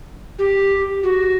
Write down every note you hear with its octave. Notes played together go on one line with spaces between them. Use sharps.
G4
F#4